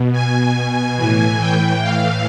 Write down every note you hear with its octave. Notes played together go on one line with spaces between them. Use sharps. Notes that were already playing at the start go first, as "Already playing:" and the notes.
Already playing: B2
G#5
G#5
G#5
A2 E3 G#5
G5
F5